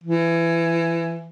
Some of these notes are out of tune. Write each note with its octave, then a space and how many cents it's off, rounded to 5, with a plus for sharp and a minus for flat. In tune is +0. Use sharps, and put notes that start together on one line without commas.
E3 +20